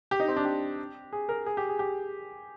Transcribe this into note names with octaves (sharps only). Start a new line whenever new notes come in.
G4
D#4
C4
D4
G4
G#4
A#4
G#4
G4
G#4
G4